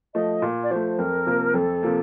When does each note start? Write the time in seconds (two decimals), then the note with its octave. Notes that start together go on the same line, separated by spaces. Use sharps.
0.14 F3 A3 D#5
0.42 A#2
0.63 D5
0.71 F3 A3 C5
0.98 F2 A#4
1.27 C3 F3 A#3
1.54 F2 A4
1.83 C3 F3 A#3